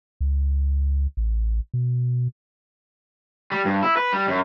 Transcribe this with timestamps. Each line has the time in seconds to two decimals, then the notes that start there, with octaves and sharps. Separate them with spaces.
0.21 C#2
1.17 A1
1.74 B2
3.52 G3
3.65 G2
3.83 E4
3.97 B4
4.12 G3
4.27 F#2